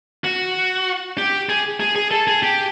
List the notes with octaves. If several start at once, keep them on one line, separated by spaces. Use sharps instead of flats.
F#4
G4
G#4
G#4
G#4
A4
G#4
G4